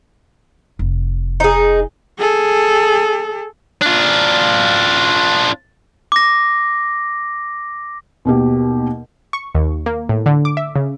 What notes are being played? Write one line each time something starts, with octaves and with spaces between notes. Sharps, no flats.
F1
D#4 G#4
G#4 A4
D4 F4
D6 A#6
D#2 B2 G4
C#6
D#2
A#3
A2
D3
D6
E5
C#3